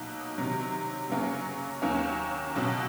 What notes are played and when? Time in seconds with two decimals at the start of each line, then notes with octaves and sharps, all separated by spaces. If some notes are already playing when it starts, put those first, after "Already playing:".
Already playing: B2 F#3 A#3 D#4
0.38 C3 D#3 F#3
1.10 F#2 C#3 F#3 A#3 C#4
1.82 D#2 D#3 F#3 A#3 C#4
2.55 C#2 B2 F#3